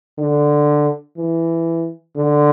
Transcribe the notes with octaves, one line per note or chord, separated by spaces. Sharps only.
D3
E3
D3